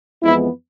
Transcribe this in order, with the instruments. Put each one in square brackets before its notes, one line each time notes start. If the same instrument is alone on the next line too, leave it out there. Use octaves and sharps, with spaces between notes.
[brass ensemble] F2 E3 G#3 B3 E4